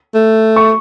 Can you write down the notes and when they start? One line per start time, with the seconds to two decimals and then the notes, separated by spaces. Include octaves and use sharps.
0.15 A3
0.56 C#6